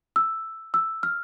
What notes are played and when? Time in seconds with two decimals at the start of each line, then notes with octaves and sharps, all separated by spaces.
0.16 E6
0.74 E6
1.03 F6